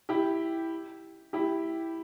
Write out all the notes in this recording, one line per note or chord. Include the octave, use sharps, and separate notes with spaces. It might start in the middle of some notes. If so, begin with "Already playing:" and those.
E4 G4
E4 G4